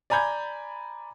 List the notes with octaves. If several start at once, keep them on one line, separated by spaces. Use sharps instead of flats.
D5 G#5 A#5 B5 G6 G#6